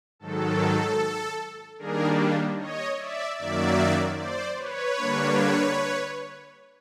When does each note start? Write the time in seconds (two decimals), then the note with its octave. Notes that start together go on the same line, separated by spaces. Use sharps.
0.19 G#2 D#3 F#3 A4
1.78 D#3 G3 A#3 D4 G#4 A#4
2.58 C#5 D#5
2.98 D5 E5
3.38 F#2 D#3 F#3 A#3 D5 E5
4.17 C5 D5
4.57 B4 C#5
4.97 D3 G3 A#3 D4